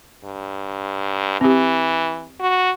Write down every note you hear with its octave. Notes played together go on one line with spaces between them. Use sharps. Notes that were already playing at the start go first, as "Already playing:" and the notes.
G2
E3 C4 G4
F#4